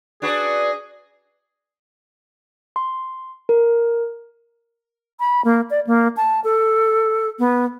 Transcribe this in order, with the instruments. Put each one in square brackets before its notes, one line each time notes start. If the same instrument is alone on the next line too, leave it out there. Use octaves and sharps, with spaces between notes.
[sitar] D4 F#4 B4 [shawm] G#4
[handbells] C6
A#4
[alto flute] B5
A#3
D5
A#3
A5
A4
B3